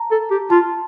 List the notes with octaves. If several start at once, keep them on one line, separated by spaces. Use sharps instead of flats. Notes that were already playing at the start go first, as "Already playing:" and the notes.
Already playing: A5 A#5
A4
G4
F4 A5